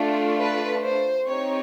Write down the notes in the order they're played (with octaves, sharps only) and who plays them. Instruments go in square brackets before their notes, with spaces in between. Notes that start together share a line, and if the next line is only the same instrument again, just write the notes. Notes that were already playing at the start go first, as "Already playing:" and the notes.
Already playing: [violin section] A3 D4 F4
B4
C5
C4 D#4 G4 C#5